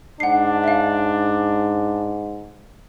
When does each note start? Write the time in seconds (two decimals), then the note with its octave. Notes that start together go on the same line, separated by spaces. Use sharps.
0.20 G#2 D4 F#5 C7
0.64 E5 F5